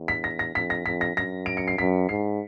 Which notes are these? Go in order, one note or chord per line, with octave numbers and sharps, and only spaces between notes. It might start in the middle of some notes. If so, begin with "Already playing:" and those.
Already playing: E2
B6
A#6
A#6
F2 B6
A#6
F2 B6
A#6
F#2 A#6
D7
C#7
C7
F#2 B6
G#2 C7